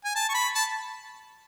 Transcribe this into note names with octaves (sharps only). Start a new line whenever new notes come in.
G#5
A5
C#6
B5
A5